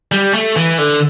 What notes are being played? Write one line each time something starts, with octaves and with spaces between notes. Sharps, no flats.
G3
A3
E3
D3